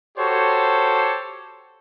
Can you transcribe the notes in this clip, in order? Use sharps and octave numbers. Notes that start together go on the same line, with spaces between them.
F#4 G4 A4 C5 C#5